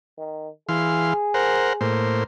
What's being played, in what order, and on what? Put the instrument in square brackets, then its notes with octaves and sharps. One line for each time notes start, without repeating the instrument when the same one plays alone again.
[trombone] D#3
[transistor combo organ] E3 F5 C6 [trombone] G#4
[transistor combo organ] A#4 C5 F#5
A2 A#3 C5